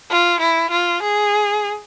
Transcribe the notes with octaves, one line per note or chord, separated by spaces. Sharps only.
F4
E4
F4
G#4